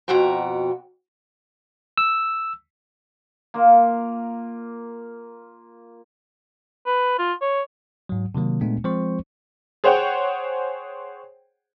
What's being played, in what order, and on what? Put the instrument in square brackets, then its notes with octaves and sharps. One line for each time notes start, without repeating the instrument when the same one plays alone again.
[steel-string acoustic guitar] F2 B2 F#4 G5 A#5
[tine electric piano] E6
[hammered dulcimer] A#3 F4 A#4
[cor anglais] B4
F4
C#5
[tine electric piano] G#2 F#3
C3 D#3 F#3 A#3
A#2 G#3 A3 B3 D4
F3 G#3 C4 C5 C#6
[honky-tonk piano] G#4 C5 C#5 F#5 G5